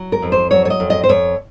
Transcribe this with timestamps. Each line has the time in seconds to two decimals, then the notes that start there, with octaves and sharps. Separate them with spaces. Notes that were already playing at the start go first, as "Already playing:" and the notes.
Already playing: F#3
0.12 A#4
0.22 F2
0.32 C5
0.51 F#3 C#5
0.65 C#5
0.70 D#5
0.80 F2
0.90 D#5
1.04 C5
1.09 F2 C#5